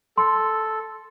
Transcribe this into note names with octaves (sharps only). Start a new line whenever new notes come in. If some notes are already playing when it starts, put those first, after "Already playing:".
A4 C6